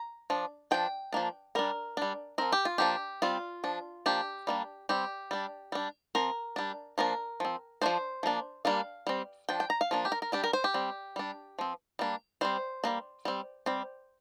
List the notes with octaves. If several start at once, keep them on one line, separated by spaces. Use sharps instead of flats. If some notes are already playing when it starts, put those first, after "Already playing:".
Already playing: A#5
F3 D4
F3 D4 G5
F3 A#3 D4
G3 D4 A#4
G3 D4
F3 C4 A#4
G4
F4
F3 A#3 D4 G4
G3 C4 F4
F3 D4
F3 A#3 D4 G4
G3 A#3 D4
G3 C4 G4
G3 D4
G3 D4
F3 C4 A#4
G3 D4
F3 A#3 D4 A#4
F3 C4
F3 A#3 D4 C5
F3 A#3 D4
G3 A#3 D4 F5
G3 C4
F3 D4 G5
G5
A#5
F5
F3 A#3 D4
G4
A#4
A#4
G3 D4 G4
A#4
C5
G4
G3 C4
G3 D4
F3 C4
G3 A#3 D4
G3 C4 C5
G3 A#3 D4
G3 C4
G3 C4